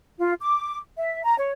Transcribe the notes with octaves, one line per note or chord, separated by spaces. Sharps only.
F4
D6
E5
A#5
C#5